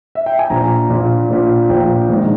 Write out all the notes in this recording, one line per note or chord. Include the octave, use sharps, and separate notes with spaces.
E5
G5
G#5
A#1 A#2 A#5
A#1 A#2
A#1 A#2
A#1 A#2 G5
A#1 G#2 D#3